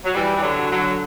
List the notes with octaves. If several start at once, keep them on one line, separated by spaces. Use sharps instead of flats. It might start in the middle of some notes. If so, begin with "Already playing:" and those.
F#3
E3 G3
E3
D3 F#3
D3 F#3